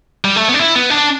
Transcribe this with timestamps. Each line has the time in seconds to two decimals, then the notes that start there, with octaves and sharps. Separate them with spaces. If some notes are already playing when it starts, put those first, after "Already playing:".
0.25 G3
0.36 A3
0.49 B3
0.54 D4
0.59 E4
0.75 B3
0.90 D4